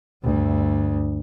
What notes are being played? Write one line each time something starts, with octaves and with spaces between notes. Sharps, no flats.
D2 G2